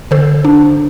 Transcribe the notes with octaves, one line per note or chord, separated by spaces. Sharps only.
D3 A4 C5
D4